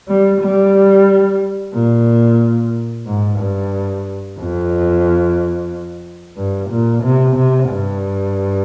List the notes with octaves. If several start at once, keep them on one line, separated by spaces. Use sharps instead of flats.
G3
G3
A#2
G#2
G2
F2
G2
A#2
C3
C3
G2